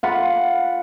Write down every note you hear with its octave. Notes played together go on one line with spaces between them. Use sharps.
F4 F#5 B5